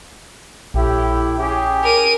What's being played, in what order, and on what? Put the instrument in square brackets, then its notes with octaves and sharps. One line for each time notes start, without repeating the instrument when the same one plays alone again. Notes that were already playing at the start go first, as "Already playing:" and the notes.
[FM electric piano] A#1 [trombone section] A2 E4 G4
[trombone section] C#4 G4 G#4
[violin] A#4 D#7